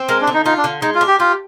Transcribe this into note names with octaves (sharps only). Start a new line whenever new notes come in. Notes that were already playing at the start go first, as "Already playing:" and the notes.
Already playing: C4
G#3 A#4
D4
D3
D#4
D#4 F4
D4
D3
G#3 D#4
F4
D4
G4
F4 G4